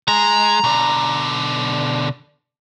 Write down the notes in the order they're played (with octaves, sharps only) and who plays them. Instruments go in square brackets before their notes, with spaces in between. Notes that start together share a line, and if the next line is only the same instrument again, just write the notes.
[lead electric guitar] G#3 [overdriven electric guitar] A#5
[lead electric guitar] B2 D3